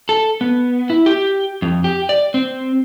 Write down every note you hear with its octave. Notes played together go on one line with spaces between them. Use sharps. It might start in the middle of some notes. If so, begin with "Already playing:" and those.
A4
B3
E4
G4
F2
G4
D5
C4